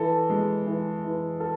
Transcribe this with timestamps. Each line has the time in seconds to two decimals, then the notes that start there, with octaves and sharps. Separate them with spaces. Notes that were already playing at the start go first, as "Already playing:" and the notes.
Already playing: E3 A4
0.30 G#3
0.66 E3
1.04 E3
1.40 A4